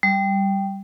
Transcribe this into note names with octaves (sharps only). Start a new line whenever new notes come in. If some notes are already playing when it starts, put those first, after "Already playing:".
G3